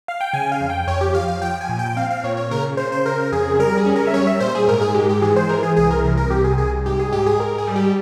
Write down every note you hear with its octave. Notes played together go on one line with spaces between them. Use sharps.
F5
G5
C#3 G#5
F5
F2
G5
F2 C#5
G4
F3 F5
F5
F3 G5
G#5
A#2
G5
C4 F5
F5
A#2 C#5
C#5
C#3 A#4
C#3 C5
C5
C#3 A#4
F2 G#4
G3 A#4
G#4
C#4
A#4
E5
G3 C#5
E5
A#2 C5
G#4
G#2 A#4
G#4
G#3 G4
G4
E3 G#4
C5
E3 A#4
G#4
C2 G#4
A#4
C3 A#4
A#4
C2 G4
G#4
C2 G#4
G#2 G4
G#4
G#2 G4
G#4
G#2 A#4
G#4
G3
G4